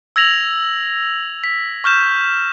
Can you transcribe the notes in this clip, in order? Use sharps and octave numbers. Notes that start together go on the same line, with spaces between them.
E6 G#6 A#6 F7 F#7
B6
C#6 F6 G6 E7